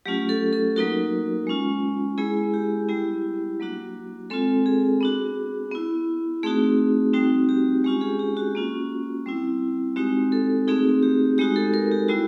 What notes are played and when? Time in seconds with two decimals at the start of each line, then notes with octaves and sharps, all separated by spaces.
0.06 F#3 A3 C#4 F4 G4
0.29 A4
0.53 A4
0.76 F#3 A#3 D#4 F#4 A#4
1.47 G#3 C#4 F4
2.18 G#3 B3 E4 G#4
2.54 G4
2.89 G3 B3 E4 G4
3.60 F#3 A#3 D4 F#4
4.30 G#3 C4 F4 A4
4.66 G#4
5.01 B3 D4 F#4
5.72 B3 E4
6.43 A3 C4 D#4 F#4 G#4
7.13 G3 C4 D#4 F#4
7.49 G4
7.84 G#3 C#4 F4 G4
8.01 G#4
8.19 G4
8.37 F#4
8.55 A#3 C#4 F4
9.26 G3 C4 E4
9.96 G#3 C4 D#4 F#4 G4
10.32 A4
10.68 A3 C4 D#4 F#4 G#4
11.03 G4
11.38 G#3 B3 D#4 F#4 G4
11.56 A4
11.74 A#4
11.91 G4
12.08 G3 B3 E4 F#4